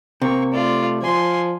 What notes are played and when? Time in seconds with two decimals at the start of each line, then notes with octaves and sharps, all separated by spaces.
0.22 C3 A#3 C#6
0.53 A3 F4 D5
1.02 F3 G#5 C6